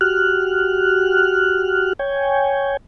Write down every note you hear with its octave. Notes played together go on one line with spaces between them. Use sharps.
F#4 G4 F6 F#6
C#5 G5 G#5